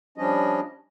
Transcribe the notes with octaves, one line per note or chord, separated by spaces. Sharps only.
F3 G3 C#4 D4 D#5